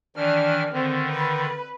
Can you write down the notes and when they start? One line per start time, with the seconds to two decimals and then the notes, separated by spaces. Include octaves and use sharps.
0.16 D#3 E3 D4 F6
0.73 D3 D#3 C4
1.10 B4